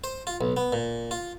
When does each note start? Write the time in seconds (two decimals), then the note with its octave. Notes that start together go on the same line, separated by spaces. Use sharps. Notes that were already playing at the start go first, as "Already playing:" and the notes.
0.04 C5
0.27 F4
0.41 B1
0.57 B3
0.73 A#2
1.11 F4